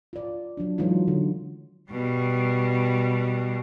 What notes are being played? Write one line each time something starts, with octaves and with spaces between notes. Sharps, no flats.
F4 D5
F#3 D4
E3 F#3 G#3 D#4 F4
D3
B2 G3